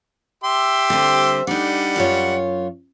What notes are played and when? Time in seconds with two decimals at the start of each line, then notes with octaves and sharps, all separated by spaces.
0.44 G4 E5 C6
0.90 D3 G3 C4
1.47 G3 D4 D#4 F#5
1.96 F#2 F4 C#5